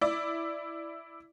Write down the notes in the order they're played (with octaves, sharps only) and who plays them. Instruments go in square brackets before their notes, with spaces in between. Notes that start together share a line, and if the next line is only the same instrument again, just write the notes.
[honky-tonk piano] E4 D5